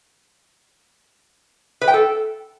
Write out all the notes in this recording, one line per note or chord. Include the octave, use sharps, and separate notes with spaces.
B4
G5
A4